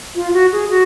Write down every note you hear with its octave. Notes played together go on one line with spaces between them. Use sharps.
F4
F#4
G#4
F#4